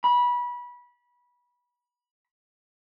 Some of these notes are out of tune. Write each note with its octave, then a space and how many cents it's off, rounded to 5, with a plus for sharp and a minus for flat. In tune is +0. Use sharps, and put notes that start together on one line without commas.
B5 -25